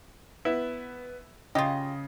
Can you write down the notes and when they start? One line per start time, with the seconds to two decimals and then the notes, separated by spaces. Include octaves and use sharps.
0.45 B3 E4
1.55 C#3 F4 G4 D#5